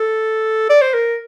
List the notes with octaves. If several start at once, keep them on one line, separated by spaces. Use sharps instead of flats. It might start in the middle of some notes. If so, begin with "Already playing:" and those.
Already playing: A4
D5
C5
A#4